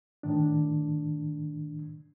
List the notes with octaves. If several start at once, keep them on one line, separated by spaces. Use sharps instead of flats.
A2 D#3 D4